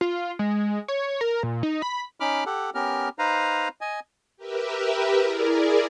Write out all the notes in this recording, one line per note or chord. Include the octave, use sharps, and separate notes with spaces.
F4
G#3
C#5
A#4
A#2
D#4
B5
C#4 D#4 B5 D6 F6
G4 A4 F#5
B3 C#4 G4 A#4 F6
D#4 B4 C5 F5 A#5
D#5 G#5
G4 A#4 B4 E5
E4 G#4 A#4 D5